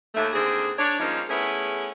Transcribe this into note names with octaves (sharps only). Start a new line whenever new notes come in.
D#2 A3
D#2 D3 C4 G#4
D4 C#5
F3 G3 G#3 A#3 C#4 D#4
A3 B3 C#4 E4 G#4